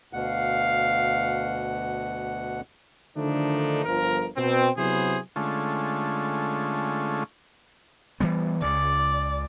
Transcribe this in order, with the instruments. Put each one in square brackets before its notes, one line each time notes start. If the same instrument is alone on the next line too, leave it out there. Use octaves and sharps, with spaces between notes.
[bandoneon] D2 B2 F#5 [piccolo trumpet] F5
[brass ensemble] D3 D#3 F3 A3 D4 D#4
G1 F3 A#4
B2 C4
C3 F#3 B3 E4 G#4 C5
[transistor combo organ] D3 G#3 A3 C#4 F4
[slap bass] E3 G3 B3
[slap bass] C#2 C#3 [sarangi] D5